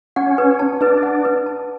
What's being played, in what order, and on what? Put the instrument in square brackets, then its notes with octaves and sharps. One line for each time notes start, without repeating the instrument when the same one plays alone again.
[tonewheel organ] C#4 [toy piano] F#5
[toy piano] B4
A5
[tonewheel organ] D4 [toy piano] B4
[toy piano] F#5
B4
A5